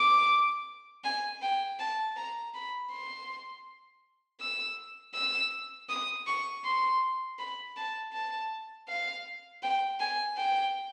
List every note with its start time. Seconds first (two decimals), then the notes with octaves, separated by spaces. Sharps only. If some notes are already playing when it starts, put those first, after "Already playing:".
Already playing: D6
1.04 G#5
1.42 G5
1.79 A5
2.16 A#5
2.54 B5
2.91 C6
4.40 E6
5.15 E6
5.89 D#6
6.27 C#6
6.64 C6
7.39 B5
7.76 A5
8.13 A5
8.88 F5
9.63 G5
10.00 G#5
10.37 G5